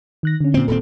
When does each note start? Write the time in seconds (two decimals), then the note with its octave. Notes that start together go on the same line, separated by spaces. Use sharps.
0.23 D#3 F#6 A#6
0.40 D3 C#4
0.54 A#2 C4
0.68 D#1 A#2 C4 A4